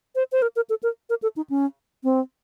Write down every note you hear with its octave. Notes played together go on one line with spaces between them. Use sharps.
C5
C5
A#4
A#4
A4
A#4
A#4
A4
D#4
C#4
C4